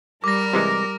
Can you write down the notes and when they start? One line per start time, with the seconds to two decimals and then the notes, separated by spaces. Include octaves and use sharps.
0.24 G3 A#4 D6 A#6
0.53 C3 E3 G#3